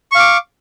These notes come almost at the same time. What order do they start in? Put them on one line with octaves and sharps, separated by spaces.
C#6 F5 D6